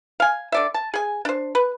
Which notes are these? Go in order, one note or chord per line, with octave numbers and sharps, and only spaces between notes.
F5 G#5
D3 D5 E5
A5
G#4 G#5
D4 C5
B4